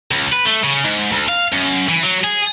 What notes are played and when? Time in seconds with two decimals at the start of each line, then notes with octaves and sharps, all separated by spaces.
0.11 C#2
0.32 B4
0.45 A3
0.64 C#3
0.84 G#2
1.12 D2
1.29 F5
1.52 F#2
1.89 E3
2.03 F#3
2.24 G#4